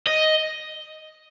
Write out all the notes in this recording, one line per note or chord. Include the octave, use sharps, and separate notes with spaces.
D#5